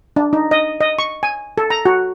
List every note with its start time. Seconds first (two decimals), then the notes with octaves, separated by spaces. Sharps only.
0.16 D4
0.33 D#4
0.51 D#5
0.80 D#5
0.99 C#6
1.23 G#5
1.58 A4
1.70 A#5
1.86 F#4